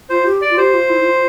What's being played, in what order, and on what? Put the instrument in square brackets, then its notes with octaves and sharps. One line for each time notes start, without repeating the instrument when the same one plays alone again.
[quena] F4 [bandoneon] C5
[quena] G4
[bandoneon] D5
[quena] F4
[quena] G4 [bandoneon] C5
[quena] F4
E4
E4
F4